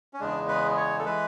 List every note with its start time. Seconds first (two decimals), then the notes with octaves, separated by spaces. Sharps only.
0.13 C#4
0.20 E2 C#3 G#3 D4
0.48 B4
0.77 C#5
0.99 A4
1.04 E3 G#3 B4